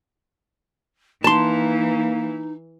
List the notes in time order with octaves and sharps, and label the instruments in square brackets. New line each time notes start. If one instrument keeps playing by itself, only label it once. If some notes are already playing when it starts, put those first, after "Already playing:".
[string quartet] E3 [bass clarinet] A#3 [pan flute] D#4 [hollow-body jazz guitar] A5 C6